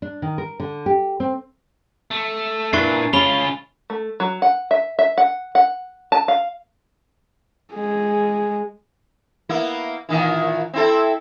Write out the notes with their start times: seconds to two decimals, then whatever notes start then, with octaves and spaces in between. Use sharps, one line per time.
0.02 D4
0.22 D#3
0.38 A#4
0.60 D3
0.86 G4
1.20 C4
2.11 A3
2.73 A#2 D4 E4 B4 C#6 A6 C7
3.13 C#3 C#4 F4 B5 F7 G7
3.90 A3
4.20 F#3
4.42 F#5
4.71 E5
4.99 E5
5.18 F#5
5.55 F#5
6.12 A5
6.28 F5
7.73 G#3 G#4
9.49 A#3 B3 E4
10.09 A#2 D#3 E3
10.73 C4 E4 A4